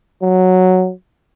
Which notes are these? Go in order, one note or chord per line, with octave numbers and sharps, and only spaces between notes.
F#3